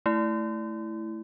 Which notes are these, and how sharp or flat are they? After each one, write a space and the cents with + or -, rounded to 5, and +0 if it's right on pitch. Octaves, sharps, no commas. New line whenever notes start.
A3 +0 E4 +0